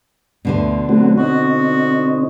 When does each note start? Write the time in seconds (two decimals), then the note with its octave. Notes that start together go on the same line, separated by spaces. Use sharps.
0.45 D2 B2 D3 C5
0.89 F#3 A3 C4 F#4
1.18 C4 D#4 F#4